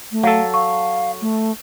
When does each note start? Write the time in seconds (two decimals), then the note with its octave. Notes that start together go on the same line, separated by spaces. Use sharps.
0.12 A3
0.23 F#3 A4 F5
0.54 F5 C#6
1.22 A3